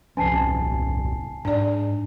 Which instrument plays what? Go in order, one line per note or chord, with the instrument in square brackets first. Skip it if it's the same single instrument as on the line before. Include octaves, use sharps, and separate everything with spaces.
[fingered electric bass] D#1 C2 C#4 [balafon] F3 [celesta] G#5 A5 C7
[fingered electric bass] G#2 [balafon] D4 D5